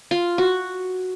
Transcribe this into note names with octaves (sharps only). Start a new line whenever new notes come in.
F4
F#4